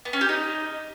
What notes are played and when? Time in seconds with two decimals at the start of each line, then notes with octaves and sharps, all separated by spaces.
0.05 B3
0.13 C#4
0.21 G4
0.29 D#4